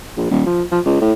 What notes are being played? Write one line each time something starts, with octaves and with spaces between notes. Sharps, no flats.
A#1
D#1
F3
F3
C#2
A2